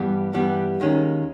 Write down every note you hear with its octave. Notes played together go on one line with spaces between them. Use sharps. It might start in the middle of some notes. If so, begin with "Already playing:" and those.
Already playing: G2 E3 G3 B3 G4
G2 E3 G3 B3 G4
D#2 D#3 G#3 C#4